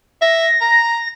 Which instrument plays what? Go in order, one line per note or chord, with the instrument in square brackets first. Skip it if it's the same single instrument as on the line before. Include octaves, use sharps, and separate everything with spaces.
[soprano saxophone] E5 [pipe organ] A#6
[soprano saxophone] A#5